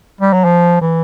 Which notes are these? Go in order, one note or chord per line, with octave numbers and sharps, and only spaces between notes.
G3
F#3
F3
E3